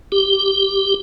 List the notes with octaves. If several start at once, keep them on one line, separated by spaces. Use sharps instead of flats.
G4